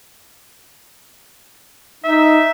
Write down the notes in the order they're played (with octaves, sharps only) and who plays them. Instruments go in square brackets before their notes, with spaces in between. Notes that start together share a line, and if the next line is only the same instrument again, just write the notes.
[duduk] D#4 [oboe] E5